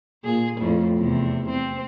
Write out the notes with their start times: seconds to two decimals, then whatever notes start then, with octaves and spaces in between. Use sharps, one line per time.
0.24 A#2 G#4
0.58 F2 A2
0.98 E2 C3
1.49 C4